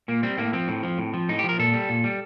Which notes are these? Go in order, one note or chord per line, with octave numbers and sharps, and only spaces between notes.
A#2 A#3
G3 C4
A2 A#3
F3 C4
A2
F3
A2
F3
A2 D#4
G4
F3
A#4
A#2 A4
G3
A#2
G3